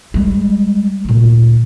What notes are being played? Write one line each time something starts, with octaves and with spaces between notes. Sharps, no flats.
G3 G#3
D2 A#2